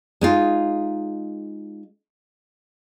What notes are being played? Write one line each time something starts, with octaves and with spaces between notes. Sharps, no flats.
G#3 D#4 F4